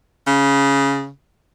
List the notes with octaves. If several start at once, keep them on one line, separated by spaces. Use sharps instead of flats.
C#3